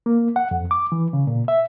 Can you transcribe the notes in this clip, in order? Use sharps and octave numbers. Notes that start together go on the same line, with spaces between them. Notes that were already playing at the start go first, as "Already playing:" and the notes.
A#3
F#5
F2
D6
E3
C#3
A#2
E5